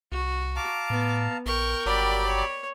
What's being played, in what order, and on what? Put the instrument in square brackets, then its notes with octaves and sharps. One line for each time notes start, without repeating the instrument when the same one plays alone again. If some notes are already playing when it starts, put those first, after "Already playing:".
[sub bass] C2 [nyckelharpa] F#4
[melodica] F5 A5 A#5 [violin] D6
[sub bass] A2 [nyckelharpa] B3
[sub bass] A#1 [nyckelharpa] A#4 G5 [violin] C#6
[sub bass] G1 [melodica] F#3 G3 G4 [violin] D5 B5
[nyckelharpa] C#5